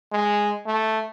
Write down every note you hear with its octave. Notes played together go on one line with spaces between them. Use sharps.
G#3
A3